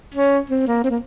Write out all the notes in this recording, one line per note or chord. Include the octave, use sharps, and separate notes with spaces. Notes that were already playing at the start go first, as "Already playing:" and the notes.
C#4
C4
A#3
C4
A#3